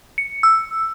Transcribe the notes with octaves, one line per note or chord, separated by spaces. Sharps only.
C#7
E6